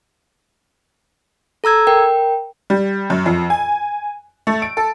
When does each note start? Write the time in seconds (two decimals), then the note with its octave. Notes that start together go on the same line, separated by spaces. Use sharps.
1.64 A4 A#5 E6 G#6
1.87 A#4 G5
2.70 G3
3.10 F#2
3.26 F2
3.50 G#5
4.47 A3
4.62 D7
4.77 A4